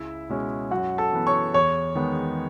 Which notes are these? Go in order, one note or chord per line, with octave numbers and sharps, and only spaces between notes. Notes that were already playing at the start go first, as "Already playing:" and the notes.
Already playing: C#2 E4 E5
B2 G#3 C#4
F#2 F#4 F#5
A4 A5
E3 B3
C#5 C#6
E2 C#5 C#6
D#3 G#3 B3